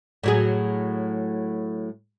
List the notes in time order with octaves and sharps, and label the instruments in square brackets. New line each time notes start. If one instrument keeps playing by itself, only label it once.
[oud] A2 F#3 G#4